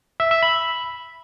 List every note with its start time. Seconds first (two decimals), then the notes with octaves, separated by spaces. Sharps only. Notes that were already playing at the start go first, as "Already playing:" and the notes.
0.20 E5
0.31 E5
0.43 B5